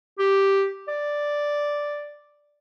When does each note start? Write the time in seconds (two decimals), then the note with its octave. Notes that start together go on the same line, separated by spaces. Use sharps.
0.19 G4
0.88 D5